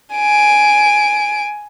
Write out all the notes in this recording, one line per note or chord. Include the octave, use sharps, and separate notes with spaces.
G#5 D7